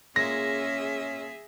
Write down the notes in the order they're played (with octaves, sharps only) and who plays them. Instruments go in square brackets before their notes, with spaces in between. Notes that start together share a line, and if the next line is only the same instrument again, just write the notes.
[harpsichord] A#2 G#3 [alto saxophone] C#4 [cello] G#4 E5 [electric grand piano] A#6